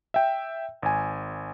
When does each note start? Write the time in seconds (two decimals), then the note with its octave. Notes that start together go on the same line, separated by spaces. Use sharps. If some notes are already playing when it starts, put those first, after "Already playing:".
0.14 E5 G5
0.82 G#1 G#5